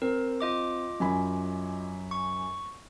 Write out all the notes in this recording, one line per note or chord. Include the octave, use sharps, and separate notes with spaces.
C4 A#4
F4 D#5 D6
F#2 G#5 B5
C#6